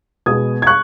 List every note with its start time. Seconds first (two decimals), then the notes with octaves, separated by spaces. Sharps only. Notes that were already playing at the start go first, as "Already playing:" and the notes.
0.26 B2 G#3 B3 D#6 G#6
0.62 G#6
0.67 C#6 F#6